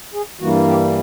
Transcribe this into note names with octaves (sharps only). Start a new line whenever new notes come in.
G#4
G2 E3 G3 A#3 F#4
G4